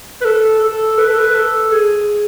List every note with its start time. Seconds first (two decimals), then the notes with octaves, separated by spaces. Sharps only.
0.21 B4
0.25 A4
0.62 A4
0.98 B4
1.09 A4
1.19 B4
1.35 A4
1.72 G#4